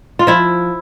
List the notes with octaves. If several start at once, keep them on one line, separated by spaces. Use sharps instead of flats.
F4
F3 E4